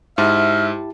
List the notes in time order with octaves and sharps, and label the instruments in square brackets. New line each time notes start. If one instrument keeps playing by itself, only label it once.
[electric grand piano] G#2 [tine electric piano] E4 G4 A5 [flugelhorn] E5 [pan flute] F6